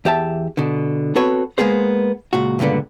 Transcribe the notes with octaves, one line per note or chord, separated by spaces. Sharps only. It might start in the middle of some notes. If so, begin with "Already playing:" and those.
E2 G4 E5 A5
B2 D3
B3 C4 F#4 A4 B4 C#5
G#3 A#3 B3 G#4 C5
C#2 A#2 F#4
C#2 G2 A#2 D3 B3